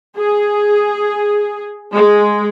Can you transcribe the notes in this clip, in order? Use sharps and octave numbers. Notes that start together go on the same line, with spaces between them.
G#4
G#3